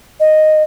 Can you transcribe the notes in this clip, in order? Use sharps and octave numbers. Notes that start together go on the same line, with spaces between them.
D#5